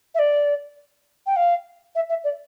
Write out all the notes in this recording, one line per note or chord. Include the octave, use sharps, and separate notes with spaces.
E5
D5
G5
F5
E5
E5
D5